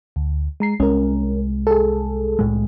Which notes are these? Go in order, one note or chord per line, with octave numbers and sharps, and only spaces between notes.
D2
G#3 A#5 C7
C2 G#3 C#4 A#4
G#4 A4
C2 A2 G#3